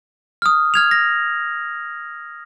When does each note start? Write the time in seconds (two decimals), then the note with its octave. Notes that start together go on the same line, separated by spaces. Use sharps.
0.42 D#6 F6
0.74 F6 G#6 F7
0.91 A#6